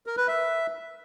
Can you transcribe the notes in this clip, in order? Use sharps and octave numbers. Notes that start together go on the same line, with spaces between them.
A#4
B4
E5